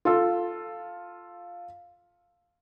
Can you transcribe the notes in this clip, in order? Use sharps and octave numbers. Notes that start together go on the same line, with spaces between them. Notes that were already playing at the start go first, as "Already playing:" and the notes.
F4 A4